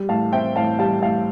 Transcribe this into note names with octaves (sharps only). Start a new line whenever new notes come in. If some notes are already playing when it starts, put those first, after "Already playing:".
Already playing: G3
A2 F5 A5
C4 E5 G5
A2 F5 A5
G3 F5 A5
A2 F5 A5